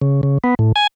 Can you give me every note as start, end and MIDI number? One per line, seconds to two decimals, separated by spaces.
0.02 0.21 49
0.23 0.38 49
0.44 0.55 59
0.59 0.72 45
0.76 0.87 80